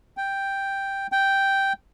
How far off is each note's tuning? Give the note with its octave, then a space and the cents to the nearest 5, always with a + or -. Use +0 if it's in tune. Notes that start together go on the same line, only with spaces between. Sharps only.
G5 +0
G5 -5